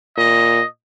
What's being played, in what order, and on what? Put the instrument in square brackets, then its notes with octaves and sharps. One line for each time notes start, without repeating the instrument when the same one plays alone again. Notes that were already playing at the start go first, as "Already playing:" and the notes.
[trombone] A#2 [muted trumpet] D#5